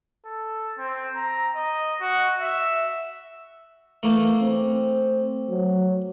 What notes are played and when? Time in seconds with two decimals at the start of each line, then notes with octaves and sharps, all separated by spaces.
0.25 A4
0.78 C4
1.15 A#5
1.55 D#5
2.00 F#4
2.40 E5
4.03 E3 A3 A#3
4.40 C4
5.49 F#3